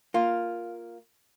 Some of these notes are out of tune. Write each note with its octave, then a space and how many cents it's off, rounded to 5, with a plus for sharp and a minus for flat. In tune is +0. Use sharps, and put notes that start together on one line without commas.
A#3 +0 F4 +0